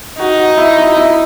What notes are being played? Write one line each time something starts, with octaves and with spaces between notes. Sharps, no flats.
D#4 F#4
F#4
E4
E4
E4